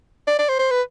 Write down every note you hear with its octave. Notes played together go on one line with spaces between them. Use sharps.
D5
D5
C5
C5
B4